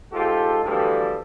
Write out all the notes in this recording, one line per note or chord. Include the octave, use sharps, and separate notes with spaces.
G#2 F4 G4 A4
D2 E3 F3 G3 G4 A4